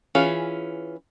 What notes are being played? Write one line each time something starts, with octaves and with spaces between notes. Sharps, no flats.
E3 C#4 F4 G#4